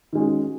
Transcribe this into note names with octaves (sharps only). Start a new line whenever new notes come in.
D#3 G#3 C#4 F#4